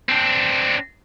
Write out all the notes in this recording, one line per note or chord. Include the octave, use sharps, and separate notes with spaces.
C4 D4